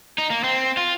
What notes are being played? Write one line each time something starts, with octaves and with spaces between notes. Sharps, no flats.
D#4
A#3
C4
F4